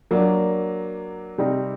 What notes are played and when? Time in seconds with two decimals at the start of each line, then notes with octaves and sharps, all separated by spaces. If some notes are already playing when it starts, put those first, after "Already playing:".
0.11 F#3 A#3 D4
1.38 C3 G3 C4 D#4